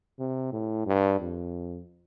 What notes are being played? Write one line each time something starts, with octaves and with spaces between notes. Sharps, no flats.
C3
A2
G2
F2